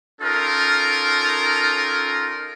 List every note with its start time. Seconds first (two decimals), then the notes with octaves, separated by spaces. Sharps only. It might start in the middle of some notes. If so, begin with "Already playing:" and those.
0.22 C#4 D#4 F4 A4 A#4